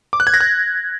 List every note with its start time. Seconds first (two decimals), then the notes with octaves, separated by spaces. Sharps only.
0.13 D6
0.20 F#6
0.27 G#6
0.34 A#6
0.40 F#6